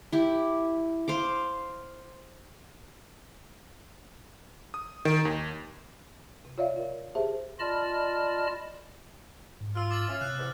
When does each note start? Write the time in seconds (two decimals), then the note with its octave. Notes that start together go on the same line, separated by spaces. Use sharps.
0.12 E4 G4
1.08 C5 F5 D6
4.74 D#6
5.05 D#3
5.25 D#2
6.45 C3
6.58 F4 C#5 D5 E5 F5
6.76 F4 A#4
7.15 G4 G#4 C5 E5 A5
7.60 F4 D5 D#5 A5 B5 F6
9.61 G#2
9.75 F4 E6 F6
9.91 D6 A6 F#7
10.08 C#4 E5 F5
10.21 C3 F#6
10.37 E2 G#2 G3